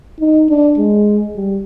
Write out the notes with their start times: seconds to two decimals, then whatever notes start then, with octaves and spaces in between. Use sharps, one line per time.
0.20 D#4
0.49 D4
0.78 G#3
1.36 G3